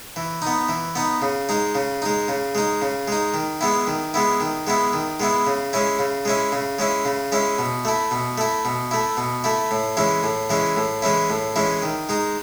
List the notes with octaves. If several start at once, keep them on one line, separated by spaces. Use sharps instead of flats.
E3
B3 D#4
E3
B3 D#4
C#3
G#3 D#4
C#3
G#3 D#4
C#3
G#3 D#4
C#3
G#3 D#4
D#3
G#3 B3 E4
D#3
G#3 B3 E4
D#3
G#3 B3 E4
D#3
G#3 B3 E4
C#3
G#3 C#4 E4
C#3
G#3 C#4 E4
C#3
G#3 C#4 E4
C#3
G#3 C#4 E4
B2
A3 E4
B2
A3 E4
B2
A3 E4
B2
A3 E4
A2
E3 G#3 C#4 E4
A2
E3 G#3 C#4 E4
A2
E3 G#3 C#4 E4
A2
E3 G#3 C#4 E4
D#3
G#3 D#4